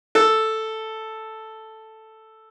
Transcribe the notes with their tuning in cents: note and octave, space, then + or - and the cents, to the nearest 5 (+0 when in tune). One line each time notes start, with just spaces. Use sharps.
A4 +0